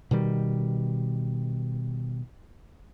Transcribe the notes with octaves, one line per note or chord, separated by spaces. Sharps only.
B2 D#3 G3